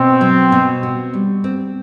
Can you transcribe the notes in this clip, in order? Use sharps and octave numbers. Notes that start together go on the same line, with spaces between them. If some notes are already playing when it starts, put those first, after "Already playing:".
Already playing: B2 C4
F#3
B2
F#4
G3
C4